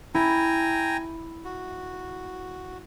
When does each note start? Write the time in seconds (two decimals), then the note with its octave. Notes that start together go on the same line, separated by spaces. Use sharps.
0.15 E4 G5 G#5 A#5
1.45 F#4